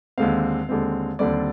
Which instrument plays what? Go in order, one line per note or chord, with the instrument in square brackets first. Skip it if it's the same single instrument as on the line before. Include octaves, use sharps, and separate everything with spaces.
[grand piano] D#2 D3 G#3 C4 F5
D#2 D3 G#3 C4
D#2 D3 G3 C4 D5